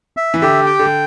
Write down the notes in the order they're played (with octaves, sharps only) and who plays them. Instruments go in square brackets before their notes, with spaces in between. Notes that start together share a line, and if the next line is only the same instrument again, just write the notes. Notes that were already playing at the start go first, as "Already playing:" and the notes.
[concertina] E5
[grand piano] E3
[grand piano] D3 [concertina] G4
[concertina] G5
[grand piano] D3